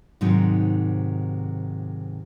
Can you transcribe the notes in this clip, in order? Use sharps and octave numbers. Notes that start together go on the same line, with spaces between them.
G#2 C3 D#3 F#3 D#4